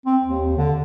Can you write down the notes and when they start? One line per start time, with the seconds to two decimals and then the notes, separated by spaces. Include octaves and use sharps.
0.06 C4
0.23 D#2
0.58 D3